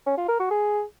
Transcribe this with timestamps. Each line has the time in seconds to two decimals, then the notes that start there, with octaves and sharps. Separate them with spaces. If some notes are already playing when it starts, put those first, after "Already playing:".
0.06 C#4
0.17 F4
0.28 A#4
0.39 F#4
0.50 G#4